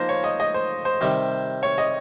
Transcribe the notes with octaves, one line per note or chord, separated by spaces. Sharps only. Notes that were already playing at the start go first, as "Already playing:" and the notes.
Already playing: F3 A#3 D#4 C5
C#5
D#5
D#5
C5
C5
C3 D#3 G3 C5
C#5
D#5